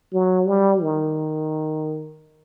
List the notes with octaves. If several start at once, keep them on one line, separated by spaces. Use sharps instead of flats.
F#3
G3
D#3